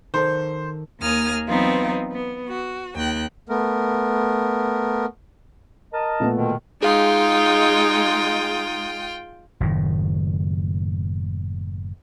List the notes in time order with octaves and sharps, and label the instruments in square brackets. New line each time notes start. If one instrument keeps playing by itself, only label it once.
[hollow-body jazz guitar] D#3 A4 [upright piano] C5
[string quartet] D#2 A#3 G#5 D#6 F6
E3 F#3 B3 C4 D#4 F4
B3
F#4
D#2 G5 F#6
[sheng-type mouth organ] A3 B3 A#4
[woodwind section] A#4 D#5 A5
[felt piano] A#2 A3 B3
[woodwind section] B2 D3 D#3
[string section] G#3 [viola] D#4 [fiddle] F4 G5 [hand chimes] G#4 F5
[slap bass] F#1 A2 D#3